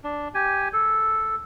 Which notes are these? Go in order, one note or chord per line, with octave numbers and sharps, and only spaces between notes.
D4
G4 G#5
A4